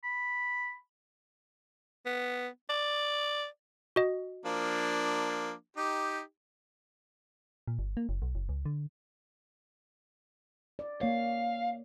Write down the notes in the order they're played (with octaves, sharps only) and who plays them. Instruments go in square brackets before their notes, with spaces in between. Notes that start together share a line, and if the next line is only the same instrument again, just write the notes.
[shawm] B5
[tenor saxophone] B3
D5
[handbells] F#4 D#5
[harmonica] F3 A#3 D4
D#4 G4
[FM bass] A#2
G1
A#3
F#1
B1
F#1
C#2
D3
[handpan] D5
[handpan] A#3 C#5 [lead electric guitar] F5